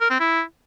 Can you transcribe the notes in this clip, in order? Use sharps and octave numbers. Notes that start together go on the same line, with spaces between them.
A#4
C4
E4